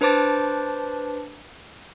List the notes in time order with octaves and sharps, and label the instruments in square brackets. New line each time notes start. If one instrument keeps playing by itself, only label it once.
[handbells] D4 B4 C5 A5 D6 A6